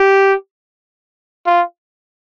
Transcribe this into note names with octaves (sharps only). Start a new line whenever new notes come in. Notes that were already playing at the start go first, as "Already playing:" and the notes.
Already playing: G4
F4